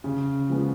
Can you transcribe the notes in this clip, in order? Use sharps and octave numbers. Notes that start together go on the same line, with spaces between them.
C#3
F3 G#3 B3